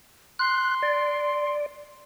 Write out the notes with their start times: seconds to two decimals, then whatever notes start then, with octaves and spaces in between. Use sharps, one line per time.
0.39 C6 F#6
0.83 D5